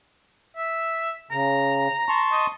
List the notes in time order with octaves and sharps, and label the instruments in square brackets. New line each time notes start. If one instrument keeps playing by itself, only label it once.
[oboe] E5
[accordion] C#3 [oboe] A#5
[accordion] A5 C6 C#6
[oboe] D#5